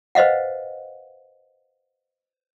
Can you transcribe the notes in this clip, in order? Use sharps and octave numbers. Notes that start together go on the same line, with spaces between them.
B4 C5 D#5 F5 F#5